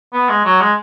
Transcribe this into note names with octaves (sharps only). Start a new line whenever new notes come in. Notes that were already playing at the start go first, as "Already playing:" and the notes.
B3
G#3
F#3
G#3